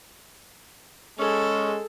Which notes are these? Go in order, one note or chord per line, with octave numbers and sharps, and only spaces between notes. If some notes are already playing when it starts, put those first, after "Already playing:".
G#3 C#4 G#4 A4